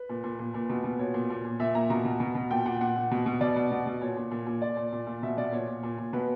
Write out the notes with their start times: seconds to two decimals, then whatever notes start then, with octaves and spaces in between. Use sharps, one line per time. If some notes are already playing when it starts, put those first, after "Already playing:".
Already playing: B4
0.09 A#2
0.24 A#2
0.39 A#2
0.54 A#2
0.69 B2
0.84 B2
0.99 A#2 C#5
1.14 A#2
1.30 A#2
1.45 A#2
1.60 A#2 E5
1.75 A#2 A#5
1.90 B2 A#5
2.05 B2
2.20 B2
2.35 B2
2.50 A#2 G5
2.66 A#2 F#5
2.81 A#2 F#5
2.96 A#2
3.11 B2
3.26 B2
3.41 B2 D5
3.56 B2
3.71 B2
3.87 B2
4.01 A#2 C#5
4.17 A#2
4.31 A#2
4.47 A#2
4.62 A#2 D5
4.77 A#2
4.92 A#2
5.07 A#2
5.23 B2 E5
5.37 B2 D5
5.53 A#2 C#5
5.68 A#2
5.83 A#2
5.98 A#2
6.13 B2 B4